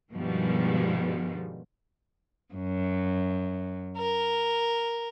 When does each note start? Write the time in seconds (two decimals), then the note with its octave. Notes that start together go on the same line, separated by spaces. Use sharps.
0.12 G2 B2 D#3 F3 G3 G#3
2.53 F#2
3.97 A#4